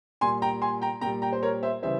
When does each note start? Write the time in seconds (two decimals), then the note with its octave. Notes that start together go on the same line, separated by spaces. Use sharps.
0.21 A#2 G3 G#5 C6
0.42 G5 A#5
0.62 G#5 C6
0.82 G5 A#5
1.01 A#2 G5 A#5
1.06 G3
1.22 G5 A#5
1.32 C5
1.43 A#4 C#5
1.63 C5 E5
1.83 C#3 E3 G3 C5 E5